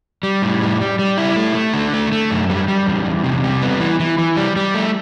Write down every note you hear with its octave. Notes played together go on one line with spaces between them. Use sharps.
G3
A2
G3
G3
G3
E4
A3
A3
D3
A3
A3
F#2
G3
G3
E2
E2
C3
G3
B3
E3
E3
E3
G3
G3
A3